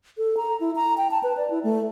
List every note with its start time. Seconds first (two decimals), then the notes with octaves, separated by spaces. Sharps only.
0.18 A4
0.37 A#5
0.60 E4
0.76 A#5
0.97 G5
1.11 A5
1.23 B4
1.37 D5
1.50 E4
1.64 A3